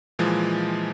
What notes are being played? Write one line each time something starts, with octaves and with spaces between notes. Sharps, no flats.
A#2 E3 F3 G#3